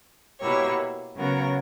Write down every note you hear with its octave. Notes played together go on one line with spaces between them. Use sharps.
B2 A#3 E4 G4 C#5
C#3 F#3 B3 F#4 A#4